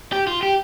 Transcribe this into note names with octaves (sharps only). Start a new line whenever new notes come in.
G4
F4
G4